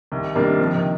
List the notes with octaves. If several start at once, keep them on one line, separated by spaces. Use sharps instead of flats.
C2 D#3
C3 D#3 G3 A#3 D4
C3 F3
D#3